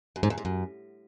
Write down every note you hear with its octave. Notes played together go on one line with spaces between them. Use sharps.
F#2
G#2
E2
G#2
F#2